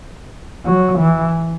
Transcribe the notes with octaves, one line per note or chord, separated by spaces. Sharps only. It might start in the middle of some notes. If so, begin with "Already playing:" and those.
F#3
E3